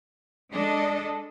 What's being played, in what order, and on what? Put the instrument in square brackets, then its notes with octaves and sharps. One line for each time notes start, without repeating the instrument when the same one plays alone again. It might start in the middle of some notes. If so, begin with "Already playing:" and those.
[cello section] G#3 D4 A4 D#5